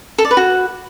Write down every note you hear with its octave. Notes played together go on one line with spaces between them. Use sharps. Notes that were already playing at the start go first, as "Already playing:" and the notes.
A4
D5
B4
F#4